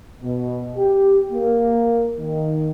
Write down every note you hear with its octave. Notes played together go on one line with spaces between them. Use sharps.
B2
G4
A#3
D#3